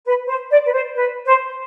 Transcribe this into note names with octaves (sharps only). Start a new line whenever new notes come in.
B4
C5
D5
B4
C5
B4
C5